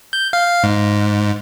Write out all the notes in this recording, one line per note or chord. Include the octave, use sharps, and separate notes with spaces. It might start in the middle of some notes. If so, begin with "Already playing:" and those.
G6
F5
G#2